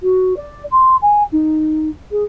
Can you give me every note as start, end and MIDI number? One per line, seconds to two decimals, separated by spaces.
0.01 0.36 66
0.36 0.64 74
0.71 0.96 84
1.01 1.23 80
1.32 1.89 63
2.11 2.23 68